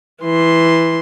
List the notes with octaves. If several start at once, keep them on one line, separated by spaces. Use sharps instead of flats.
E3 C6